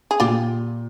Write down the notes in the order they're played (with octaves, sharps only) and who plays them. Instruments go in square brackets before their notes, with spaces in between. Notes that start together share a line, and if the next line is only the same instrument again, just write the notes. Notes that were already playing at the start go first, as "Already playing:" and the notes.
[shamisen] G#4
[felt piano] A#2 [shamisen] F4 G4